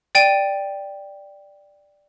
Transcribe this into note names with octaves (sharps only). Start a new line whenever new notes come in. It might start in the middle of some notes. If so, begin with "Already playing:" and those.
D5 G5 D#7